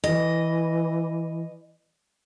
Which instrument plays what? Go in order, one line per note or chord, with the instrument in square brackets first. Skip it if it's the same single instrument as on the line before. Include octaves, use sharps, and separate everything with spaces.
[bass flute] E3 [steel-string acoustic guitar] D#5